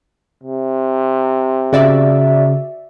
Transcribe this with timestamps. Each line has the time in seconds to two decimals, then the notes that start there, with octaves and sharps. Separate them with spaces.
0.44 C3
1.73 C#3 F#4 D5 E5